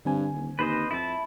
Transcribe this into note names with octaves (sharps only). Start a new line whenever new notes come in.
G2 D3 C4 G#5
D#1
D#2 B4 C5 D#5
F2 E4 A5